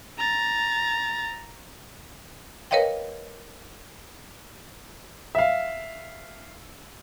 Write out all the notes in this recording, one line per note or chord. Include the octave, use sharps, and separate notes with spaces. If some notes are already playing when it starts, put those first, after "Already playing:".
A#5 A6
A#4 B4 C#5 D#5 F5 G5
E5 F5